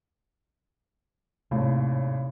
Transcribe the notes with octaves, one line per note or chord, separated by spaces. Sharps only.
G#1 D#2 A2 C3 A3